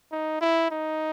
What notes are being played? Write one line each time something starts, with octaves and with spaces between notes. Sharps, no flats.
D#4
E4
D#4